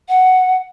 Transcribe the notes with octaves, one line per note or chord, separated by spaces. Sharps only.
F#5